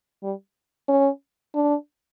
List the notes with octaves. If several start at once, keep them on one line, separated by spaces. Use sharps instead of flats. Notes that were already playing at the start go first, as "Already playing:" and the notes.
G3
C#4
D4